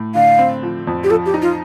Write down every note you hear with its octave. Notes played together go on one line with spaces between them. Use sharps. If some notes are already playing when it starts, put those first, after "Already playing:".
Already playing: A2
D3 F5
C4
F3
F2
G4
F3 A4
G4
D#4
F4